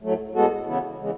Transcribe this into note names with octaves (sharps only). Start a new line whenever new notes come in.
A2 F#3 A3
A2 G#3 B3 F#4 A4
E2 C#3 E3 B3 E4
C#3 E3 G#3